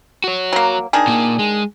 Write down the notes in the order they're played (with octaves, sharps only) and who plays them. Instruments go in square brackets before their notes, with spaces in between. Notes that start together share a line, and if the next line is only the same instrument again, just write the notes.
[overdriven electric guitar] F#4 C#5
[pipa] F#3 A#3
D#3 D4 G#4
[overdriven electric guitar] A#2 A#3
G#3